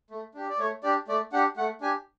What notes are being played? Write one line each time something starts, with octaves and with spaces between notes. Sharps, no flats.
A3
D4 G4
D5
A3 C#5
D4 G4 D5
A3 D5
D4 G4 F#5
A3 F#5
D4 G4 G#5